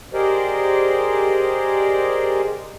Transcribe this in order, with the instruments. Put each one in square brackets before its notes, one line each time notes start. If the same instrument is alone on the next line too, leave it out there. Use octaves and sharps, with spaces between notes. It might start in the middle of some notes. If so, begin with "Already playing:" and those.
[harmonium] G4 G#4 A#4 C5 D5 D#5